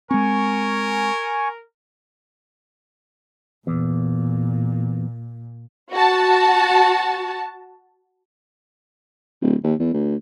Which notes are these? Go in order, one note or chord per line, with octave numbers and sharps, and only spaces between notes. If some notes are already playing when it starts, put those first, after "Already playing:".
G#3 C4 A#4 G#5 C#6
E2 A#2
F#4 A5
D1
D#2
E2
D2